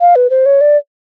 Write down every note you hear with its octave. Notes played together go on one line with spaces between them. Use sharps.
F5
B4
C5
C#5
D5